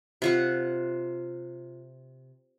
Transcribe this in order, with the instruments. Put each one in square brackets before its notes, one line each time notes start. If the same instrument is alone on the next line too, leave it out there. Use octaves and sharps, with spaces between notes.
[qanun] C3 F4 F#5